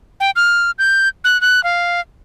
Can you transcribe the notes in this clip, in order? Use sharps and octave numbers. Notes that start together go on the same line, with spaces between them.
G5
F6
G6
F#6
F#6
F5